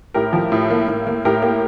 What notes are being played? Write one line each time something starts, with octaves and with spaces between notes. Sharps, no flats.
A2 G4 A#4
F3
A2
A#3
A2
A#3
A2 G4 A#4
A#3